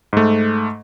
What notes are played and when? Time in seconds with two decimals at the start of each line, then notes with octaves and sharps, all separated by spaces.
0.13 G#2 A3